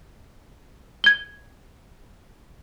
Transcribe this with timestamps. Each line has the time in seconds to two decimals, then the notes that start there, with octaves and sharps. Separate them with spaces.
1.04 G#6 G7